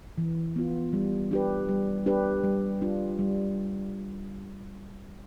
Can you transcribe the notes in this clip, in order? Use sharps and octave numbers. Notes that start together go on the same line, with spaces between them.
E3
B3 F4
G3
D4 G4 B4
G3
D4 G4 B4
G3
D4 F4
G3